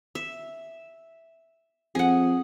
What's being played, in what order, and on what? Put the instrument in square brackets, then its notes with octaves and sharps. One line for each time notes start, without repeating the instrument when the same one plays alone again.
[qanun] E5
[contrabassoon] F2 [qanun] G#4 F#5